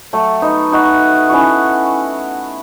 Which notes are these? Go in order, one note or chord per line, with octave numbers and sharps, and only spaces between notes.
F#3 A3
B3 D#4
D#4 F#4
C#4 E4 F#4